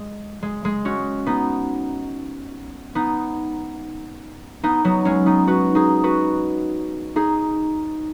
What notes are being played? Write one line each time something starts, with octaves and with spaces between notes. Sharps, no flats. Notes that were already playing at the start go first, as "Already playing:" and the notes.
Already playing: G#3
G#3
G#3
C#4 F#4
B3 D#4
B3 D#4
B3 D#4
F#3 B3
G#3 C#4
B3 D#4
F#4 B4
D#4 G#4
F#4 B4
D#4 G#4